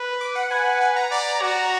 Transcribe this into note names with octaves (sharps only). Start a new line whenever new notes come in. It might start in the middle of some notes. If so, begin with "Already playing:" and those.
Already playing: B4
D6
F#5
B4 G#5
G#5
A#5
D5
F#4